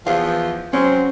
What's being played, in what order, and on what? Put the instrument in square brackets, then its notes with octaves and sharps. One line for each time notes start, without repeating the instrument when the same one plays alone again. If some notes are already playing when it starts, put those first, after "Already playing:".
[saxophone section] E2 F3 [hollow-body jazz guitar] F5
[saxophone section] F#3 G#3 C4 [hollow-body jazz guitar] C#4